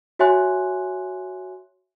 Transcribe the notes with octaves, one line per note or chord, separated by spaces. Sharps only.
F#4 C#5 E5 G#5 C6 F#6